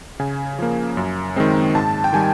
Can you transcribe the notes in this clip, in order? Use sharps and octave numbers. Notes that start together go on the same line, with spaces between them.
C#3 G#5
F3 A#3
F#2
D#3 G#3 C4
G#2 A5
G5
D#3 G3 G#5